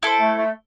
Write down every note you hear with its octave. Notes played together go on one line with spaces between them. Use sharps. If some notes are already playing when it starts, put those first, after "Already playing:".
E4 A4 C5
A3
A3